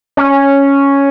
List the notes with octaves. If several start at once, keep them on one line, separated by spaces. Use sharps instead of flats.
C#4